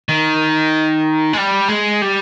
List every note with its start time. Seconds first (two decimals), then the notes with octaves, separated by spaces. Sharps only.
0.09 D#3
1.33 G#3
1.37 G3
1.68 G#3
2.02 G3